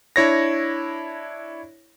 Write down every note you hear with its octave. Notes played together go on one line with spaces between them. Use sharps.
D4 E4 C#5 A#6